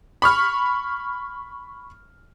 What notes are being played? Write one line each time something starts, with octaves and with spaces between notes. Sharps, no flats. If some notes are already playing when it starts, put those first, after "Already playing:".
B5 C#6 F6